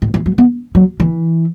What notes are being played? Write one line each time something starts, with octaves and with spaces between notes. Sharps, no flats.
A2
E3
F#3
B3
F#3
E3